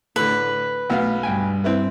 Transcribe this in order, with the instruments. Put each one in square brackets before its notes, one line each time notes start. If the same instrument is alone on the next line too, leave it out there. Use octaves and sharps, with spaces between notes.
[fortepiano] A2 D3 [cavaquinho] B4
[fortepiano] B1 B3 F5 [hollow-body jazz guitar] A3
[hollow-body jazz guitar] G2 G5 G#5
[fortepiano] C4 E4 B4